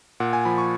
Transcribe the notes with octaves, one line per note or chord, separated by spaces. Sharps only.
A#2 F#5
G#5
F3 B5
C#6